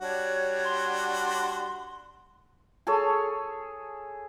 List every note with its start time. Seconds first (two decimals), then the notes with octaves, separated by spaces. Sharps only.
0.01 G3 D4 F#4 C#5
0.65 C6
2.87 G#4 A4 C#5